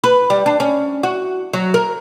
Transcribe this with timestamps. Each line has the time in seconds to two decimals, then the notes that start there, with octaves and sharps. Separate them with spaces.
0.04 B4
0.30 G3
0.46 D4
0.60 C#4
1.03 F#4
1.53 F#3
1.74 A#4